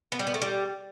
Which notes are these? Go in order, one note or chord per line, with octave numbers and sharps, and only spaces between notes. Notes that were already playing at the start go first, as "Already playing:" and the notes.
B3
G3
B3
A3
G3